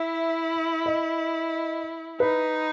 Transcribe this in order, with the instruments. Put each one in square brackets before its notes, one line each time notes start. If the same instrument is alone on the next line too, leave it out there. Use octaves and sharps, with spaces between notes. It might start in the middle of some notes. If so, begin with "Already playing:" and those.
Already playing: [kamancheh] E4 [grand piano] E5
[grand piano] D#5
[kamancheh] D#4 [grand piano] B4